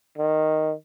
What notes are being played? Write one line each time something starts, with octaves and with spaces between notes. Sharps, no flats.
D#3